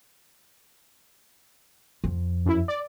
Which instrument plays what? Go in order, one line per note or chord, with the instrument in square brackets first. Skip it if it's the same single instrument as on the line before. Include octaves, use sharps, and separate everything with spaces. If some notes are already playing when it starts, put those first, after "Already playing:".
[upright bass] F2
[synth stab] F#2 E4
D5